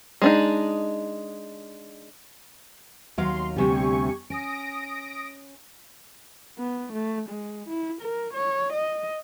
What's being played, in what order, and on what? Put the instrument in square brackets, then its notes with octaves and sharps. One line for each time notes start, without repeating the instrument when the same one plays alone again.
[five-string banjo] G#3 D4 D#4
[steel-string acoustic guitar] D#2 F#3 F5 [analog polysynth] C6
[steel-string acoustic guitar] D2 C3 G3 [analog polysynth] G4 G#5 C#6
[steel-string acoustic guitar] C#4 [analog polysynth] D#6 A#6 D7
[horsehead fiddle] B3
A3
G#3
E4
A#4
C#5
D#5